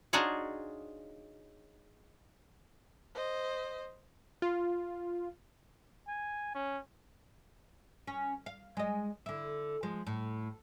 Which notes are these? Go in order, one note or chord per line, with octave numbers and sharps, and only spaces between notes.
D4 D#4 F4 F#4 G#4 C#5
C5 D#5
F4
G#5
C#4
C#4
F5
G#3 D#5
D3 E4
F3 G#3
A2